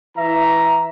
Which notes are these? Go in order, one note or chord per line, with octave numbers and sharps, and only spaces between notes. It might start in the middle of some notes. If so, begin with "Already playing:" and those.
E3 E5 A#5